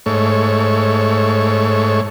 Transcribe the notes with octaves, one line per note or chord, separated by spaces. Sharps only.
G#2 A3 C#5